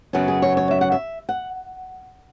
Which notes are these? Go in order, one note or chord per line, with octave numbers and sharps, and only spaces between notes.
F#2 C#3 F#3 B3 C#4
G#4
C#5
C#5
E5
F#5
E5
F#5